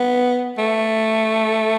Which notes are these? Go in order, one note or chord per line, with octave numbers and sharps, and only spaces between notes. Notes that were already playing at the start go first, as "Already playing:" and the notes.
Already playing: B3
A3